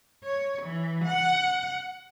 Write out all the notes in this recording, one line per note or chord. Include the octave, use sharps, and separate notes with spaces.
C#5
E3
F#5